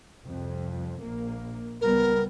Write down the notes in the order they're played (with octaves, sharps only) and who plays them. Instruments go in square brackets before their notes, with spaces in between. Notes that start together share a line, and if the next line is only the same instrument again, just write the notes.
[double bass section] C2 F2
A#1 A#3
[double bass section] C#2 G3 B3 [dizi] A#4